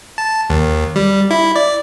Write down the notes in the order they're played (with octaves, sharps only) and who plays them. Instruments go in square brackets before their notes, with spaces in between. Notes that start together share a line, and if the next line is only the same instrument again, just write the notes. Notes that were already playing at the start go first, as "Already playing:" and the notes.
[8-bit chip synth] A5
D#2
G3
E4
D5